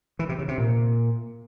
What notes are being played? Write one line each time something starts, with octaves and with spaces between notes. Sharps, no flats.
E3
C3
C#3
C3
A#2